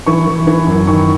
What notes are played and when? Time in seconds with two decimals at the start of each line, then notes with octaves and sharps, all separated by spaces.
0.06 E3 C#6
0.27 E3
0.47 E3
0.67 F#2
0.87 D#3 C#6